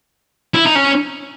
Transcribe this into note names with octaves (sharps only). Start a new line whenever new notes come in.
E4
D#4
C#4